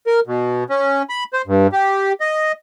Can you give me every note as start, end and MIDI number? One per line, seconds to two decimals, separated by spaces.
0.07 0.20 70
0.27 0.64 47
0.70 1.02 61
1.09 1.24 83
1.33 1.42 72
1.47 1.67 43
1.72 2.12 67
2.20 2.52 75